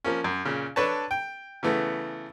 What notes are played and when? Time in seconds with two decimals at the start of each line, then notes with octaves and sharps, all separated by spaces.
0.04 F3 A#3 C#4
0.24 F#2
0.45 A#2 C#3
0.76 D4 A4 B4 C#5 A5
1.11 G5
1.63 C#3 E3 A3 B3